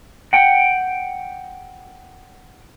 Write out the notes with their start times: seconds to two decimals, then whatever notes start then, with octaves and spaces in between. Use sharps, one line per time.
0.33 F#5 G5